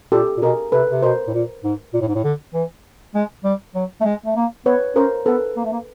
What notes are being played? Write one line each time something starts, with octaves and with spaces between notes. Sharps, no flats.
A#2 G4 A4
A#2
B2 G#4 A#4
C3 A4 B4
C3
B2 A#4 C5
A2
A#2
G#2
A#2
A2
G#2
A2
D3
E3
G#3
G3
F#3
A3
G#3
A3
A#3
B3 B4 C#5
C#4 A#4 C5
B3 A4 B4
A#3
A3
A#3